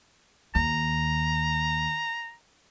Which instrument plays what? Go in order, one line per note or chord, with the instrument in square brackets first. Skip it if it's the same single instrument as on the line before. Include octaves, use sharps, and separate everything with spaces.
[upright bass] D#2 [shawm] A#5